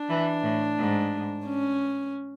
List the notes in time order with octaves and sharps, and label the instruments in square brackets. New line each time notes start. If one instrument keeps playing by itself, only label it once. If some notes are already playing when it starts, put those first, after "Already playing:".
Already playing: [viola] D4
[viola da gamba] E3
A2
G#2
[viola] C#4